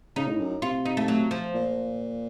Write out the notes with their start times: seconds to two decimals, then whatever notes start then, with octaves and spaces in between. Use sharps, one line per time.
0.16 C#3 D#4
0.28 A2
0.39 F#2
0.62 C3 F4
0.85 D#4
0.97 A3
1.08 F#3
1.31 F3
1.54 A#2